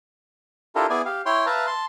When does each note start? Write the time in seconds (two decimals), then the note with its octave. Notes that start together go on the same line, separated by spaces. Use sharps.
0.75 D4 E4 F4 G4 A4 A#4
0.90 B3 E4 G#4 D5 G#5
1.06 G4 F5
1.26 E4 C#5 G5 C6
1.46 B4 E5 F5 A5 A#5
1.67 A5 C6